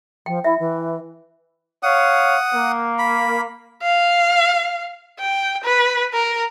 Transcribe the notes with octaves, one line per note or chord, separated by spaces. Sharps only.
F3 G5
E4 E5
E3
C#5 F5 F#5 D#6
A#3
B5
F5
G5
B4
A#4